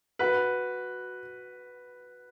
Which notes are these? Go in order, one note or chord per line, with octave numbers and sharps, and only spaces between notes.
F#4 B4